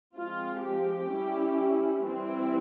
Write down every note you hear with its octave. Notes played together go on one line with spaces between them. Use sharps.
F3 G#3 C4 F4
G4
G3 C#4 E4
E3 G3 C4 E4